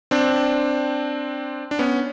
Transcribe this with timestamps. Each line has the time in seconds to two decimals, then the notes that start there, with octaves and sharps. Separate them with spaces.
0.11 C4 D4
1.71 D4
1.79 B3 C#4